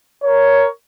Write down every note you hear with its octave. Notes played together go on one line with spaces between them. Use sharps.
A#4 C#5